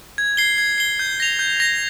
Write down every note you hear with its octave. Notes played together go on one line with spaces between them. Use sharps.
G#6
C7 G7
G#6
C7 G7
G6
A#6 F7
G6
A#6 F7